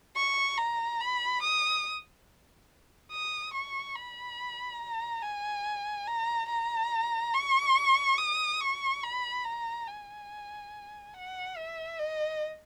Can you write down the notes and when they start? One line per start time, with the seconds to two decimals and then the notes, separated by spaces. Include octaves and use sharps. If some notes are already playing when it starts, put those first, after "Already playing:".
0.17 C#6
0.58 A#5
1.01 B5
1.43 D#6
3.12 D#6
3.54 C#6
3.96 B5
4.81 A#5
5.23 G#5
6.07 A#5
6.49 A#5
7.34 C#6
8.18 D#6
8.61 C#6
9.03 B5
9.45 A#5
9.87 G#5
11.14 F#5
11.57 E5
11.99 D#5